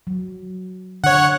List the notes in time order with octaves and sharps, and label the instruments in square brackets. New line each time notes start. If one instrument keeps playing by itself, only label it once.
[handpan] F#3
[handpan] D3 [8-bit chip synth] C#5 F#5